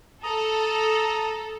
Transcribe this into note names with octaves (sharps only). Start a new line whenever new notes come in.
A4 A#5 D#6